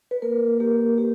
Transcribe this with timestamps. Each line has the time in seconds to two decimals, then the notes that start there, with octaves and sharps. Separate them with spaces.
0.11 B4
0.22 A#3 A#4
0.60 A#3 G4
0.98 A#3 G4